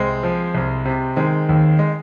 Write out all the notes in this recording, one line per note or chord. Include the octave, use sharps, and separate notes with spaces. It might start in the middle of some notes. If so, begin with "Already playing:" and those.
Already playing: C2 G#3 C4
F3
C2
C3
D#3 G#3 C4
D#2
G#3